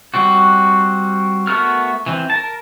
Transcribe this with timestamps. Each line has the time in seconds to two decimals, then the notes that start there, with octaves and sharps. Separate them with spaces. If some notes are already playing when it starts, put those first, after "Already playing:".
0.14 G3 C4 F#4
1.47 A3 B3 F#4 A#4 F6
2.06 E3 C4
2.30 A#4 A5